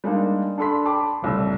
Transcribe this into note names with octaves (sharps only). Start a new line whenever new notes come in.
G3 G#3 A#3 D4 D#4
D4 A4 B5 C6 B6
G5 A5 B5 C6 D6
F#1 C2 A2 E6